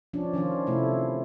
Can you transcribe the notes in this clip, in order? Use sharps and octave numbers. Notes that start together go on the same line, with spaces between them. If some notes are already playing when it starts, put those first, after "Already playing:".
F3 C#4 D4
D#3 F3 C#4 F4
C3 A3 E4